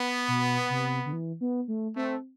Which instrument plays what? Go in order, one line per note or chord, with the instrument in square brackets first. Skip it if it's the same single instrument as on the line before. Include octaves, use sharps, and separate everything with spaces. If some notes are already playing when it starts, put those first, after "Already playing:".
Already playing: [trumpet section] B3
[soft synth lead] B2
C3
D3
E3
B3
A3
[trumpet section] A3 [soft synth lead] C4